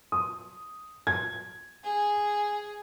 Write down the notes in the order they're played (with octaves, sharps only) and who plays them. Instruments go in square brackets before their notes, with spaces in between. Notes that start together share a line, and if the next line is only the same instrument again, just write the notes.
[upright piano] D#6
G#6
[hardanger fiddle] G#4